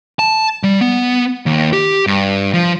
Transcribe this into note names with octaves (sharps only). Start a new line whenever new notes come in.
A5
G3
B3
D#2
G4
G2
F3